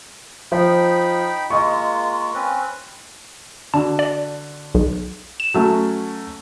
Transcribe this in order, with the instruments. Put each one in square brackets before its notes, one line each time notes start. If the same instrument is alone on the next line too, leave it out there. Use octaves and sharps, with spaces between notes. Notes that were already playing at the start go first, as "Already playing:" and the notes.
[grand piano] F3 [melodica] D#4 G5 B5
[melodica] G#3 A#3 F4 [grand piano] D#5 C#6
[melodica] C4 C#4 B4
[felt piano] D3 D4 F#4 [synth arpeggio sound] A5
[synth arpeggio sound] D5
B1
E7
[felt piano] F#3 A3 C#4